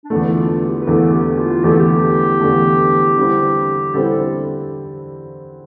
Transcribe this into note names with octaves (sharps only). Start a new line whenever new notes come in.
D4
E2 D3 A3 E4
F4
F4
G4
B4
E2 D3 A3 A4
G4
F4
E2 D3 A3 G4
A4
G4
E2 D3 A3
D3 G3 C4 E4
D3 G3 C4 E4 A4